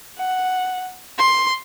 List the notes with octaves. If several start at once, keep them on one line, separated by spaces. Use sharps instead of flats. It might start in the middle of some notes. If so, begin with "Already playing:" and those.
F#5
C6